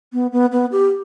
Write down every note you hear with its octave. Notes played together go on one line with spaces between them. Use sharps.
B3
B3
B3
G4